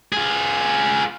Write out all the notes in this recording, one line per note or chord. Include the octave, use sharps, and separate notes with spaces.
F4 G#4